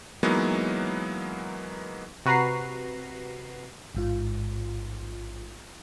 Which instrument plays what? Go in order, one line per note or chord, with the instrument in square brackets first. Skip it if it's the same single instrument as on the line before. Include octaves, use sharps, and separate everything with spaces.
[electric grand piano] E3 F#3 G#3 A#3 B3 D#4
[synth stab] C3 F#4 B4 A#5 C7
[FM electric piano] A1 G#2 F4